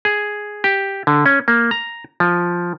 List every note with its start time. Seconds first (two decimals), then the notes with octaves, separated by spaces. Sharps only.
0.05 G#4
0.64 G4
1.07 D3
1.26 C#4
1.48 A#3
1.71 A#5
2.20 F3